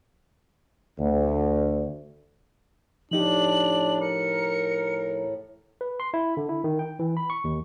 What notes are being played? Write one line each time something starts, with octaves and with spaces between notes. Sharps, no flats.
D2
A2 F3 D4 D#4 G4 F#7
A#4 C#7
B4
C6
E4
D3
E4
D#3
G5
E3
B5
C#6
D#2